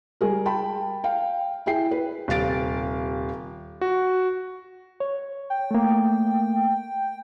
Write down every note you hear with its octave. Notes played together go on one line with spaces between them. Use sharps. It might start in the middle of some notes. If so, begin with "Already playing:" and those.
G3 G#4 A#4
G5 A5 B5
F5 G5
E4 G#4 G5 C7
B4
D#1 C3 F5 A6 D7
F#4
C#5
G5
A3 A#3